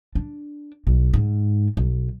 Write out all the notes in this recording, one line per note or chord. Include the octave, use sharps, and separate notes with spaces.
D4
B1
G#2
B1